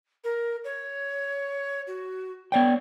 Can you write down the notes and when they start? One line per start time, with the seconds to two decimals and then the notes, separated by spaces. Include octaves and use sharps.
0.24 A#4
0.64 C#5
1.87 F#4
2.52 B3 C#5 D5 G5